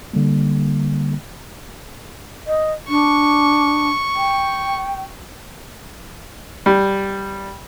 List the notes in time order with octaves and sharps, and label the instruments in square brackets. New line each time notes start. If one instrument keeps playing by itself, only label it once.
[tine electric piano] D3 G3 A#3
[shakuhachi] D#5
[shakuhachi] D4 [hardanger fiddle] C#6
[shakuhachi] G5
[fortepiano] G3